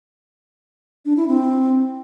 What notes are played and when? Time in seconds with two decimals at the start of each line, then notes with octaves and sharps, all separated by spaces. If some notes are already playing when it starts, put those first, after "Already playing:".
1.05 D4
1.17 E4
1.28 C4